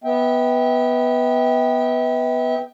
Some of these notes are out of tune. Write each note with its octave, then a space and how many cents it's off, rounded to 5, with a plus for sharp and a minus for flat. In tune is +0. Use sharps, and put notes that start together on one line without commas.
B3 +0 E5 -40 G5 +0